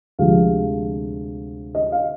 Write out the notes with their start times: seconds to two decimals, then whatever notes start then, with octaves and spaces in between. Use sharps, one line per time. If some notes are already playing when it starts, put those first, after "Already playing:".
0.18 D2 C3 F3 G#3 F5
1.75 D#5
1.92 F5